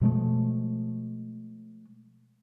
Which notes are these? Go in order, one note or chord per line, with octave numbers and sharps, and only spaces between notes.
B2 F3 G#3 A3